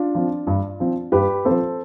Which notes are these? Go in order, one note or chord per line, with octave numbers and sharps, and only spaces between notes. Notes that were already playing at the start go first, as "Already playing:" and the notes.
Already playing: D4 F4
F3 C4
G2
F3 C4
G2 G4 B4
F3 C4 A4 C5